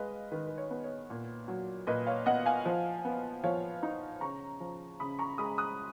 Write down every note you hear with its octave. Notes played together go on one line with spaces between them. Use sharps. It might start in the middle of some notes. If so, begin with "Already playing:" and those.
Already playing: G#3 B4 D#5 F5
D#3 B4
B4
C#5
B3
C#5
A#2
F#3
A#2 B4 D#5
C#5 F5
B3 D#5 F#5
F5 G#5
F3
B3
F3 C#5 F5
D#4
C#3 A#5 C#6
F3
C#3 B5 D#6
A#5 C#6
G#3 B5 D#6
D#6 F#6